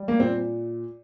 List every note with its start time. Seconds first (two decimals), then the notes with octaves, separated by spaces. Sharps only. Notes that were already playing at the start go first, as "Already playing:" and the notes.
Already playing: G3
0.08 A#3
0.20 A#2 C4